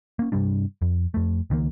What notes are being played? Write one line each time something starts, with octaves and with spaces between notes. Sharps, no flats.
A#3 C#4
G2 C3 G3 D4
F2
F2 A3
C#2 D#3 A3 A#3